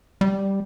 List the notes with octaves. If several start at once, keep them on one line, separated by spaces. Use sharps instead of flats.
G3